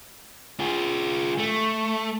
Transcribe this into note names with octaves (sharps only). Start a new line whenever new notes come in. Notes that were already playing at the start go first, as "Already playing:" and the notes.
F4 G#4
A3